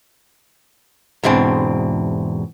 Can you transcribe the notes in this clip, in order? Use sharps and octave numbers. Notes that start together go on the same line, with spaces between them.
E2 G#2 B2 C4 D4